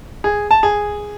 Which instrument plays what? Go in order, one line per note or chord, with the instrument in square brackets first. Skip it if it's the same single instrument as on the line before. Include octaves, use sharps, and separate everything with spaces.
[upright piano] G#4
A5
G#4